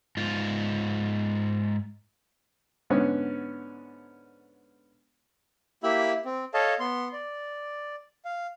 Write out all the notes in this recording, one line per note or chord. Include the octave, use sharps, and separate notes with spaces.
G#2 F4
G#2 D3 B3 C#4
A#3 E4 G4 E5 B5
C4
A4 C#5 D#5 F5 A5
B3 C6
D5
F5